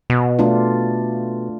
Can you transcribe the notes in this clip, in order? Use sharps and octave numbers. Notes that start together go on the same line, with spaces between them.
B2
A3 D4 F4